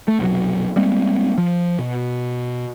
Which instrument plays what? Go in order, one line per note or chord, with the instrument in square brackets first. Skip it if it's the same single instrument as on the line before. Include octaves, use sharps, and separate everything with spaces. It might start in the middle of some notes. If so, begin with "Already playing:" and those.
[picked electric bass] A3
F1 B1 F#3
G3 G#3 A#3 C4
F3
B2